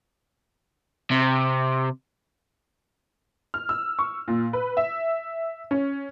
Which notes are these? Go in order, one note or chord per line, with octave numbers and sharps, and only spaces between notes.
C3
F6
E6
C#6
A#2
B4
E5
C#4